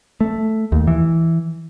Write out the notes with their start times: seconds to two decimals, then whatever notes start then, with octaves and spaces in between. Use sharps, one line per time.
0.21 A3
0.72 D#2
0.87 E3